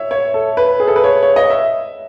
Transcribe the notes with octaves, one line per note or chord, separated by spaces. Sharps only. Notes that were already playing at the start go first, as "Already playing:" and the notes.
Already playing: C#5 E5
C#5
A4
B4
G#4
A4
B4
C#5
C#5
D#5
E5